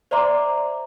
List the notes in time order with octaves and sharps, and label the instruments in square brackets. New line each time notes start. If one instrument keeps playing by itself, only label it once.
[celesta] C5 D5 E5 A#5 C6 D6